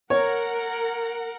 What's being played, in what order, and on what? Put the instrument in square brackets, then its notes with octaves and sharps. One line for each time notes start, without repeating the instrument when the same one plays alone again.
[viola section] A#4 F#5 [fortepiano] C#5